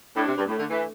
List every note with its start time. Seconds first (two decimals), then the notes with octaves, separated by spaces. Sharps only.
0.16 A2 D4
0.27 C3
0.38 G2
0.48 A2 A3
0.59 D3
0.70 E3